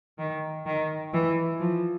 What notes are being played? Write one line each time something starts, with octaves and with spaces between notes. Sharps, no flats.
D#3
D#3
E3
F3